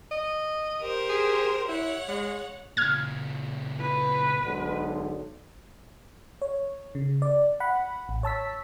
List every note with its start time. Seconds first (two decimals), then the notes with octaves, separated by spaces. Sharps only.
0.11 D#5
0.81 G4 A#4 C5
1.09 G#4
1.68 E4 C#5 F#5
2.08 G#3
2.77 A#2 C#3 F6 G#6
3.81 B4
4.44 B1 G#2 D3
6.42 C#5
6.95 C#3
7.22 D5
7.60 F#5 B5
8.09 A1
8.23 C#5 A5 E6 B6